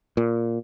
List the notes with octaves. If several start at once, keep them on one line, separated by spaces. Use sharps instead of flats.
A#2